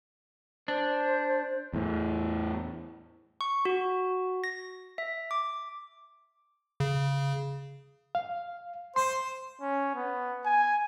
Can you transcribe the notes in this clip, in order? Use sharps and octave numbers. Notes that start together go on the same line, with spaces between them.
D4 C5
E2 A2
C#6
F#4
A#6
E5
D6
C#3
F5
C5 C6
C#4
B3
G#5